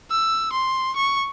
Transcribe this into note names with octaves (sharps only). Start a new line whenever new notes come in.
E6
C6
C#6